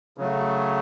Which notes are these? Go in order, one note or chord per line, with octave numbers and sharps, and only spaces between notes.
C#3 F#3 A3